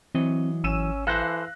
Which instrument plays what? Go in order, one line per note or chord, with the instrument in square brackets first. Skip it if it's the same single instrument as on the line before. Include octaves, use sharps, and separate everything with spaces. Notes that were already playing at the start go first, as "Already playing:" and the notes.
[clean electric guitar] E3 F#3 D#5 [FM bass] C4
[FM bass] G#1 [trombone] C#4 [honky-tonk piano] E6 D#7 E7
[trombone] E3 [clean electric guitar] A4 C5 [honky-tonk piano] F5 F#6 A#6